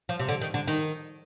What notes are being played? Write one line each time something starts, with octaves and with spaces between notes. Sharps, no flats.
F3
C3
D3
D#3
D3
D#3